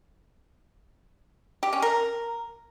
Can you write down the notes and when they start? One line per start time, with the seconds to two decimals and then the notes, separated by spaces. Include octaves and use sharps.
1.63 G4
1.73 C#4
1.82 A#4